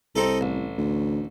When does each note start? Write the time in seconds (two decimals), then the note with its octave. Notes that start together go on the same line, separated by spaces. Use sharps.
0.16 C2 C4 D#4 A4
0.41 A1
0.78 D2